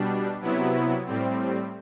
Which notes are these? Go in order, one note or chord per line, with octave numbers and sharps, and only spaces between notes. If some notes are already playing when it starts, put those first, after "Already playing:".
Already playing: B2 G3 D4
C3 F#3 B3 E4
A2 G3 C4